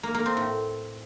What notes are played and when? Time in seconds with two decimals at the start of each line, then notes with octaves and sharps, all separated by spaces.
0.03 A#3
0.15 A#3
0.26 C4
0.37 A2